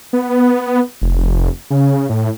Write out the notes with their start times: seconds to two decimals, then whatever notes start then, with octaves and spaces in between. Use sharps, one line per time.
0.13 B3
1.01 F1
1.70 C#3
2.10 A2